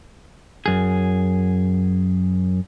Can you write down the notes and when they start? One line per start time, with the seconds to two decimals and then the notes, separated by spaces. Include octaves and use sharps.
0.66 F#2 G#4